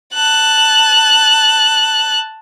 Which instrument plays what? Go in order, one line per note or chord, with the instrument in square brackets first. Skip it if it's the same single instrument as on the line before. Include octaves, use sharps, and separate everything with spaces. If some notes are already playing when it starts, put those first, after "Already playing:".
[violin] A5 F#6